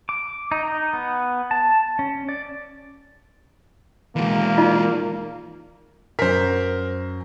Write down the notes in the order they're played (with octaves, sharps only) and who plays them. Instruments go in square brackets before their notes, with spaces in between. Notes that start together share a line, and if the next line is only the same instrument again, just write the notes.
[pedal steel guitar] D6
D#4
D#4
B3
A5
C#4
D5
[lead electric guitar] E3 G#3 [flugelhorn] A#3
[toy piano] D#4 F4 D5
[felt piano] F#2 B6 [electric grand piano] A#4 C5